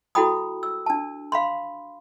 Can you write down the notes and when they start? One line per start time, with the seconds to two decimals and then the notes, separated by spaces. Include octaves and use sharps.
0.15 E4 F#4 A4 G5 B5 D#6
0.63 E6
0.86 D4 A5
1.32 F5 B5 C6